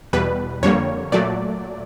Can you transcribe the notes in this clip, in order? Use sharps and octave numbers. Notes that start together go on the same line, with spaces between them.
E2 B2 G3 B4
F2 D3 G3 A#3 C#5
A#2 F#3 A3 D5